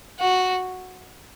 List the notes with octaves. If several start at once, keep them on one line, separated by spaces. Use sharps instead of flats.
F#4